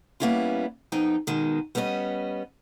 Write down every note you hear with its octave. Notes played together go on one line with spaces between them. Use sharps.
G3 A#3 B3 C#4 E4 F4
F2 B3 D#4 G5
B2 D#3 G#3
G3 B3 C#4 A#4 D#5